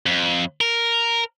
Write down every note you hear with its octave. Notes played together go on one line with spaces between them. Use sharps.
F2
A#4